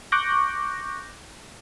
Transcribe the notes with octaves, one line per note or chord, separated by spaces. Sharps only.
C#6 D6 F#6 G6 A#6